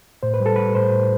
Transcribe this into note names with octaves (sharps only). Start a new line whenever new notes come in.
A2 C5
B4
G3
A4
G3 B4
A2 C5
A2